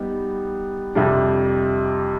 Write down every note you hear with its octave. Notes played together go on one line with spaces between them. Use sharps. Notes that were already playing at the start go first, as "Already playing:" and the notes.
Already playing: G3 B3 D#4
F2 C3 G3 D4